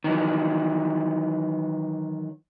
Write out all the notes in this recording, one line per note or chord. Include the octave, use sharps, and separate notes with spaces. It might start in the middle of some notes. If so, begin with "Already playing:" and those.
D#3 E3 F#3